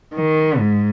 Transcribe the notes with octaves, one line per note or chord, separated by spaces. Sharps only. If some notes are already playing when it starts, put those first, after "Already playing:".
D#3
G#2